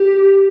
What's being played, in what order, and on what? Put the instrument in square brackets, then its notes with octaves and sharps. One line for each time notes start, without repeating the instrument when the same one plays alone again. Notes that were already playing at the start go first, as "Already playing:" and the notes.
Already playing: [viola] G4